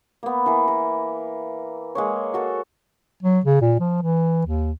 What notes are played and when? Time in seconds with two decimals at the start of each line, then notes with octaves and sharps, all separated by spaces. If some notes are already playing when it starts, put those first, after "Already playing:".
0.23 A#3 B3
0.46 E3 A#4
0.68 A#4
1.95 G#3 A#3 C#5
2.34 F#4 A4 A#4
3.23 F#3
3.45 C#3
3.61 A#2
3.80 F3
4.02 E3
4.46 D#2